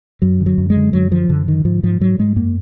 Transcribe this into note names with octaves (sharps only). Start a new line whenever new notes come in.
F#2 F#3
D3
F#3
F#2
G#3
D3
F#2 F#3
D3 F3
F#2 D3
D3 D#3
G#2 F3
G#2 F3
G#2 F#3
G#2 G#3
F#2 A#3